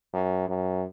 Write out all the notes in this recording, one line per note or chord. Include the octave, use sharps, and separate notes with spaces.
F#2
F#2